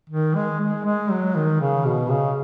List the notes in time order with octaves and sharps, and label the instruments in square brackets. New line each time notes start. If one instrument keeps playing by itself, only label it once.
[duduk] D#3
G#3
G#3
G#3
F#3
D#3
C#3
B2
C#3